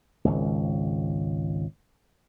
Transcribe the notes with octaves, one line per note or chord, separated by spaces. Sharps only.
G#1 C#2